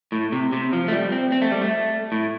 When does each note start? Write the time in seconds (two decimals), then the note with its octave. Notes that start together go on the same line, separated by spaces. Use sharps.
0.12 A2
0.32 C3
0.53 C3
0.73 F3
0.88 A3
0.92 G3
1.12 C4
1.32 C4
1.42 A3
1.52 G3
1.62 A3
2.12 A2